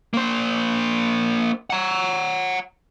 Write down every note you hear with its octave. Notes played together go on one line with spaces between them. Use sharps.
A#3 C5
F#5 A#5